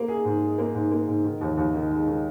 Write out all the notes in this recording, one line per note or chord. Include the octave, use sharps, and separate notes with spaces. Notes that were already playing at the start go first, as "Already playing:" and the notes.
Already playing: A#3
G#4
G#2
G#4
A#3
G#2
A#3
G#2
D#3
D#2
D#2
D#3
G#3
D#3